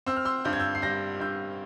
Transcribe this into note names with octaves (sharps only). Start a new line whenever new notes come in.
C4 E6
F6
C6 E6
G2 G6
G#6
E6 G6
C7
G3 G6 A#6
G2 E6 G6